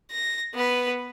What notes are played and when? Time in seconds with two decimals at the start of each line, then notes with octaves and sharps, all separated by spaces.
0.11 A#6
0.54 B3 B4